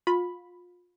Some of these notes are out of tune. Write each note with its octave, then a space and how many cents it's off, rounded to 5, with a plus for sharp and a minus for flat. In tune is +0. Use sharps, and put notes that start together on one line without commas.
F4 +30 B5 +0